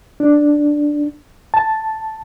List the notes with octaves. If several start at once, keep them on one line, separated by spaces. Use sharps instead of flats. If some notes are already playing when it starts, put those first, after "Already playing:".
D4
A5